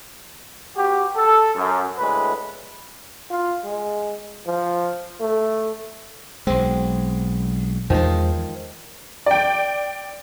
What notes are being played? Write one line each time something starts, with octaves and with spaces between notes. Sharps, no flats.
B3 F#4 G4
A4
F#2
D2 A2 G#3 B4
F4
G#3
F3
A3
B1 G#3 C4
E2 D#3 F3 G#3
D5 G5